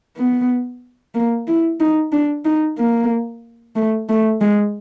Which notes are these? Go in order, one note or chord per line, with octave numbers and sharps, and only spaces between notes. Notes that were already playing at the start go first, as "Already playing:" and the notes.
B3
A#3
E4
D#4
D4
D#4
A#3
A3
A3
G#3